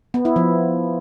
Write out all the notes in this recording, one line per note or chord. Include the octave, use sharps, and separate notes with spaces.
B3
E4
F3